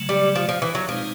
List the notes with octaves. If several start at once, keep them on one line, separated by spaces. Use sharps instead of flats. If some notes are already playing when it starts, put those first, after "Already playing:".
Already playing: C#3 F#3 A3
G3
F3
F3
E3
F#3
B2 F3 G#3 C4 D#4